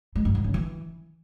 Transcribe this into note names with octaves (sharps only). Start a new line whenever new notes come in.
G#3
G2
G#2
C#3
E3